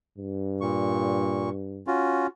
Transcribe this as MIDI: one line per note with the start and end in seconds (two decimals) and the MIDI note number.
0.18 1.85 43
0.61 1.50 46
0.61 1.50 85
1.87 2.27 61
1.87 2.27 65
1.87 2.27 66